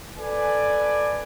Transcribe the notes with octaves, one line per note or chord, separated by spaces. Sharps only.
A4 B4 D5 G#5